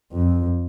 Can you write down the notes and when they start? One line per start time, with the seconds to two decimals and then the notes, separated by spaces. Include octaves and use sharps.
0.13 F2